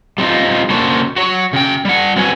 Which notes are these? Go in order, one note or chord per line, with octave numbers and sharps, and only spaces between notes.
G3 C4 D#4 F4
C#3 A#3 D4 F#4 C5 C#5
F#4 C#5
C#3 G5
G3 F#5
C4 F#4 B4 C#5 G#5